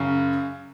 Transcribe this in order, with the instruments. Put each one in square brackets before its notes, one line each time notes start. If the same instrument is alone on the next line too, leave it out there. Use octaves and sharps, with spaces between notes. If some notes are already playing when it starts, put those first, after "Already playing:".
Already playing: [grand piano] F#2 C#3